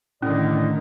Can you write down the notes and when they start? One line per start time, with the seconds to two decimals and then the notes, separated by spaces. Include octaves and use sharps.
0.22 A2 D3 D#3 C#4 D5 D#5